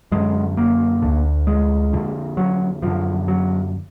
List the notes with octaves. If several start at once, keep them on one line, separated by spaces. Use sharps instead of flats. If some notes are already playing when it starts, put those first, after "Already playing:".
F#2 D3 G#3
A#3
D2 D3
G#3
F2 D3
F#3
F#2 D3 F3
F#3